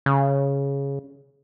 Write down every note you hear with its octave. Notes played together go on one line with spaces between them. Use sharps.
C#3